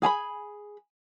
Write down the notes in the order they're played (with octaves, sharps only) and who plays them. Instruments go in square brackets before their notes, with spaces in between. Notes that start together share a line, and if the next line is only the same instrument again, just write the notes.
[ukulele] G#4 G#5 A#5 B5